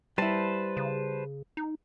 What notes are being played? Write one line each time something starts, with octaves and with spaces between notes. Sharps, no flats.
G3 E4 B4 C5 A5
C#3
D#4